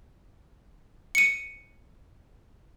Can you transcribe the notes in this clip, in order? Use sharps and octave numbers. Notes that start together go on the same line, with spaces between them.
C#7 D#7